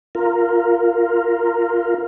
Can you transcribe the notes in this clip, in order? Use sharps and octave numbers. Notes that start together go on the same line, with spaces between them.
F4 A#4